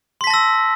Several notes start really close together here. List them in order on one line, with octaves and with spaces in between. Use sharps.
C6 B6 A5 A#6 E6